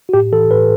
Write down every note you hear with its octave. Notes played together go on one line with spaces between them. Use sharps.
F#4
A2 G4
E3 A4
A2 B4